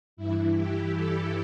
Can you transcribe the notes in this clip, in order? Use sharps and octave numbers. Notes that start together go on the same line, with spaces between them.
G2 E3 E4
G4
A4